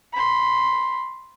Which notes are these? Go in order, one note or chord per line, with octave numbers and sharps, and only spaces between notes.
B5 C6